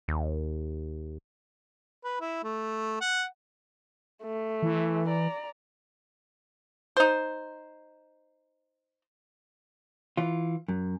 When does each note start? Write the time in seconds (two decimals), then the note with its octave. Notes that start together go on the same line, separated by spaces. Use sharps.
0.08 D#2
2.04 B4
2.21 E4
2.43 A3
3.01 F#5
4.23 A3
4.63 E3
5.07 D5 A#5
6.97 D#4 C5
10.17 E3 F4
10.68 F#2